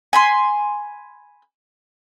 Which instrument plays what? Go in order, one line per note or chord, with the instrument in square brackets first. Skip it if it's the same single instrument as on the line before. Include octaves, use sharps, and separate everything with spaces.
[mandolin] G#5 B5 C6